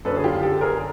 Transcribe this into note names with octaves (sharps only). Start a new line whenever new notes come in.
F#2 D3 A4 B4
G#4
F4 G4
G4 A4
G#4 A#4